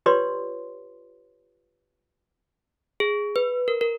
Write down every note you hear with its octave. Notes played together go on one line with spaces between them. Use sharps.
F4 G4 B4 C#5 D5 C6
G#4
B4
A#4
A#4